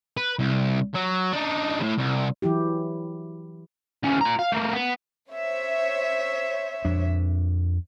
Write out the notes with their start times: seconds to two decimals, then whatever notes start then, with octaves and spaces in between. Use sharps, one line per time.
0.17 B4
0.39 C2
0.94 F#3
1.33 D4 D#4
1.79 A2 C#3
1.98 C2
2.42 E3 F#3 E4 G4
4.03 D2 C#4
4.21 F4 A#5
4.39 F5
4.52 A3 A#3
4.73 B3
5.29 C5 C#5 E5
6.85 F2 D4